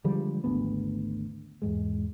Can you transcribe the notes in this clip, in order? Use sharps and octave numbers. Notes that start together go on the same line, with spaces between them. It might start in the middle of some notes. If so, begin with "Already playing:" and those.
D3 F3 G3 G#3
G#1 D2 B3
E2 G#2 G#3